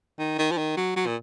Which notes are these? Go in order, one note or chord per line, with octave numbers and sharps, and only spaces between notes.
D#3
D#3
F3
D#3
F#3
F#3
A#2